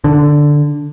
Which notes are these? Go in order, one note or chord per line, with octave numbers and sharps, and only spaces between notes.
D3